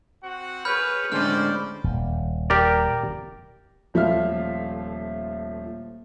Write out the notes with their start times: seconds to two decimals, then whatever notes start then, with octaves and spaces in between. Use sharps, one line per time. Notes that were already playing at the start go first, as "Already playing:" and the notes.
0.23 C4 F#4 F#5
0.65 G#4 B4 C#5 B5 F6 G6
1.12 A2 D3 G#3 C4 C#4 C5 D5 F6
1.84 D#1
2.50 G4 A#4 D5
3.94 D#1 F3 A3 E5 F5 F6